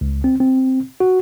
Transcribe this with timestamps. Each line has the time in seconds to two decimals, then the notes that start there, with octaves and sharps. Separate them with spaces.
0.01 C#2
0.24 C4
0.40 C4
1.00 F#4